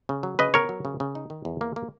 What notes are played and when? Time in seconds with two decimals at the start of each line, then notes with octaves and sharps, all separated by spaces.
0.09 C#3
0.23 F#3
0.39 C#3 B4 D#5
0.54 B3 A#4 C#5
0.69 F#3
0.85 C#3
1.00 C#3
1.15 D#4
1.30 D#3
1.45 E2
1.61 A#3
1.76 A#3